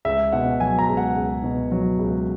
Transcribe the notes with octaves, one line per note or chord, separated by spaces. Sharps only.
C#2 E5
B2 F#5
F#3 G#5
A#5
C#2
F#5
C#2
B2
F#3
C#2